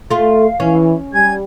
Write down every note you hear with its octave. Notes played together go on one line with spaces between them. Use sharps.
A3 F4 F5
E3 C#4
G3 G#5 G#6